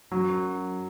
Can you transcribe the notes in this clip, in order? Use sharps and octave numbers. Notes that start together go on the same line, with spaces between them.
F#2 F#3